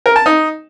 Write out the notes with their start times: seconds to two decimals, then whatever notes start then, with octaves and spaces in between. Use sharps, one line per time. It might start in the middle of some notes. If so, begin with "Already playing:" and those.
0.06 A#4
0.16 A5
0.26 D#4